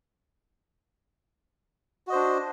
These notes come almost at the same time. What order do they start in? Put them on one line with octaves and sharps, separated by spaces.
F#4 D#5 C5 D4